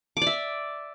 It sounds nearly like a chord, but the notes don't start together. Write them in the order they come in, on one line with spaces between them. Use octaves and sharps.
D6 D5 E5